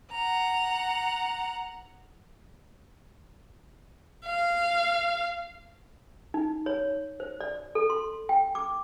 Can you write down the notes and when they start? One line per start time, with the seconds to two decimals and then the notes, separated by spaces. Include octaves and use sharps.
0.10 F#5 A#5
4.26 F5
6.34 D#4
6.66 C#5
7.20 C5
7.41 D5
7.75 A4
7.90 C6
8.29 G5
8.55 D6